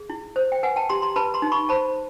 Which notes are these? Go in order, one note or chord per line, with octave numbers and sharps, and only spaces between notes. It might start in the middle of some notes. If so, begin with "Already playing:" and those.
Already playing: G#4
E4
C5
G5
B4 F#5 G#5
G5 A5
G4 A#5 C6
A#5 C6
B4 A5 B5
A#5 C6
D#4
B5 C#6
C5 A5 B5